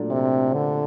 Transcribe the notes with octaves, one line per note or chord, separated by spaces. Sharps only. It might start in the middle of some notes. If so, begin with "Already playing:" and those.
Already playing: A#2 F#3 A3 D4
C3
D3